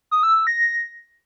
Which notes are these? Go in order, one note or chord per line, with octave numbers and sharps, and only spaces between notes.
D#6
E6
E6
A#6